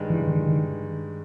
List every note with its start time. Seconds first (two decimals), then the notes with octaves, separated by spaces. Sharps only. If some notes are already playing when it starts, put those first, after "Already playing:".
Already playing: G2 D#3 G#3
0.10 E3
0.27 D#3
0.46 D#3